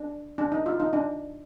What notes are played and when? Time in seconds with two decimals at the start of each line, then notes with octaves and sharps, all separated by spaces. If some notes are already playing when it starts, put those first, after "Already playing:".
Already playing: D4
0.38 D4
0.52 D#4
0.66 F4
0.80 D#4
0.93 D4